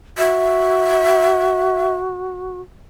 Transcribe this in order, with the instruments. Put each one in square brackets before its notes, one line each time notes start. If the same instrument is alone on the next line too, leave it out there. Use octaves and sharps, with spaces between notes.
[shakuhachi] F#4 [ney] E5